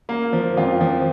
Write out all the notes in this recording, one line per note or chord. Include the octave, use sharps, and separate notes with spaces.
A#3
F3
F2 F4
F3